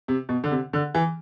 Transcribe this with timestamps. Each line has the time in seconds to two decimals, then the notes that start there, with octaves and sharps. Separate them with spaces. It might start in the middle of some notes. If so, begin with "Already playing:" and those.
0.08 C3
0.29 B2
0.44 D3
0.51 C3
0.73 D3
0.95 E3